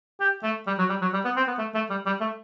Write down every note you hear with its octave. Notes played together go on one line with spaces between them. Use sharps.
G4
A3
G3
F#3
G3
F#3
G3
B3
C4
B3
A3
A3
G3
G3
A3